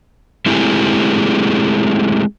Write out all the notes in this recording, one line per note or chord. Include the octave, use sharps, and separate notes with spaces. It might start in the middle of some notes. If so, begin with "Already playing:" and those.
G#3 A3 C4 E4 G4 G#4